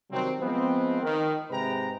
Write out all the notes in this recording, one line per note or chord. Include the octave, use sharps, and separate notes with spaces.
C3 D#3 F#3 G3 C4
F3 G#3 B3 C4
D#3
G#2 C3 G#3 B4 G5 A#5